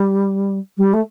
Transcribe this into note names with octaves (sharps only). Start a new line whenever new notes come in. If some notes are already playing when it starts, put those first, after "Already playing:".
Already playing: G3
G3
A3